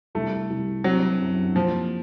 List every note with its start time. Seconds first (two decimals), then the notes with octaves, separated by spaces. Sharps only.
0.15 C2 A3
0.50 C2
0.84 F#3 C4
1.20 F#2
1.55 A#2 F3